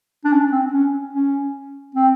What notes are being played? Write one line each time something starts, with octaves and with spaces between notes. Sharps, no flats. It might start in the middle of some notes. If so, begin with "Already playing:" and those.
D4
C#4
C4
C#4
C#4
C4